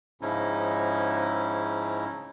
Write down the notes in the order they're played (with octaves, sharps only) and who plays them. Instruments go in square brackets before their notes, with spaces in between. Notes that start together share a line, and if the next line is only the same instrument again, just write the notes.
[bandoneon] G#2 C#3 F3 C#4 D#4 E4